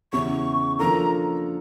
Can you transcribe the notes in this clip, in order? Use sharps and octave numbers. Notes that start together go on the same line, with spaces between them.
E2 C#3 E3 C#6
F3 A#3 D4 F4 A4 A#5